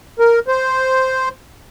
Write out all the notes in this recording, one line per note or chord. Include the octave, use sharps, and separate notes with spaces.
A#4
C5